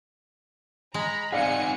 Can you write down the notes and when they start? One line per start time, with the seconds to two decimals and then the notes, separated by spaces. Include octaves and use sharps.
0.94 G#3 A#5 B5
1.32 C4 D#4 G#4 D5 F5 F#5 G#5 C#7